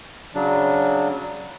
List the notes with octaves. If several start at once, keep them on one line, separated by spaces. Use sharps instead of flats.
C#3 F#3 D4